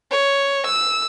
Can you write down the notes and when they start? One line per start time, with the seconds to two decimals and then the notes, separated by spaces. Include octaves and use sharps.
0.11 C#5
0.66 E6